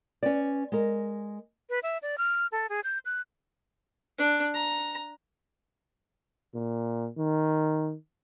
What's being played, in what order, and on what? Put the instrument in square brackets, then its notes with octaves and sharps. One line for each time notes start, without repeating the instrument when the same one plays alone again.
[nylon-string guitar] C#4 B4 D5
G#3 A#4
[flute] B4
E5
D5
F6
A4
G#4
G6
F#6
[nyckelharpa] D4
A#5
[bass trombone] A#2
D#3